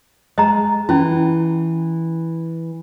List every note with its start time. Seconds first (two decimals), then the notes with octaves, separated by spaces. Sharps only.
0.38 G#3 D#5 A#5
0.89 E3 C#4 E4